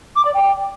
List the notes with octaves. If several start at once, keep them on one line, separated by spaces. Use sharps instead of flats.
D6
D5
G5